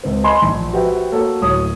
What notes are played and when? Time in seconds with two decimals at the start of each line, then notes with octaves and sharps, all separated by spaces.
0.04 C#2 C4
0.24 D#5 G#5 B5 C6
0.42 A#1
0.73 F#4 G4 B4 C5 E5 G5
1.12 A#3 F#4 A4 C#5
1.42 D1 F#3 C#5 D#6